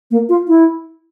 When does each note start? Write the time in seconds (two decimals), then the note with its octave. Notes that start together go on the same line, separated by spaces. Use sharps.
0.11 A#3
0.29 F4
0.48 E4